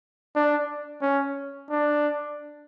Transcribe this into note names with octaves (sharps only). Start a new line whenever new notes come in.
D4
C#4
D4